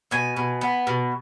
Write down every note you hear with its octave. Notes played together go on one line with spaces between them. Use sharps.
B2 G#5
B2
B3
B2